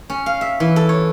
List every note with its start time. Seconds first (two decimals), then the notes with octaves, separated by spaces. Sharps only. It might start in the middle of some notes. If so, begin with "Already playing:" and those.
0.10 C#4
0.26 F5
0.41 E5
0.60 E3
0.76 A4
0.89 C#5